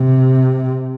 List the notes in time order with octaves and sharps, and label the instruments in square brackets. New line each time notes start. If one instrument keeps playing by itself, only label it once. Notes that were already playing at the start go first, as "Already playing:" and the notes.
Already playing: [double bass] C3